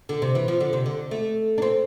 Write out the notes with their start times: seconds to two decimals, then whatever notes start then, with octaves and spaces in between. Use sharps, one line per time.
0.09 D3
0.22 C3
0.35 E3
0.48 F3
0.60 D3
0.73 C3
0.86 D3
1.11 A3
1.58 D4
1.62 C4